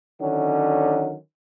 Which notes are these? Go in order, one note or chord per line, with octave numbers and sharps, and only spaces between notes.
D3 D#3 F#3 C#4